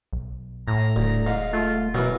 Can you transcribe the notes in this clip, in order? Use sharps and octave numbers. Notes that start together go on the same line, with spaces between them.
B1
A2 A#5
D#1 D2
G#2 F5
A3 F4
B2 E3 F#3 A#4